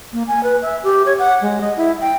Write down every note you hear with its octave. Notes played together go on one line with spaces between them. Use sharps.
A#3
G#5
B4
E5
G4
C#5
F#5
G#3
D#5
E4
G5